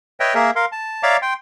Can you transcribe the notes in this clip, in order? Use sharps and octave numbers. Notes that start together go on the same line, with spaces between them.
B4 C#5 D#5 E5 G5
A#3 G#4 A#4 E5
A#4 F5 C6
A5
C#5 D5 E5 F5 A#5 D6
G5 C6